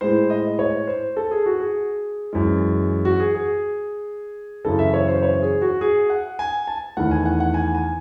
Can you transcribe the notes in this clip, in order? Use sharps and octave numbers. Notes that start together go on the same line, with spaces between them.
A2 G#3 C5
D#5
C#5
C5
A4
G#4
F#4
G#4
F#2 E3 G#3
F#4
G#4
G#4
F#2 C#3 E3 A4
E5
C#5
C5
C#5
G#4
F#4
G#4
F#5
G#5
A5
E2 D#3 A3 F#5
G#5
F#5
F#5
G#5
G#5